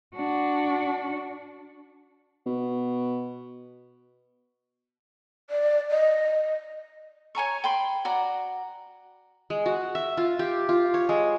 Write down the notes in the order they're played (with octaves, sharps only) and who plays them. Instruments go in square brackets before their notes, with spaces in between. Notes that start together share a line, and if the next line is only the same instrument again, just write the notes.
[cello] D4 F#4
[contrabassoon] B2
[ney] D5
D#5
[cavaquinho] C#5 G#5 A#5 C#6
G5 B5 C6
F#4 D5 A#5
[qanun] G#3
F#4
E5
F4
G4
F4
C#5
G#3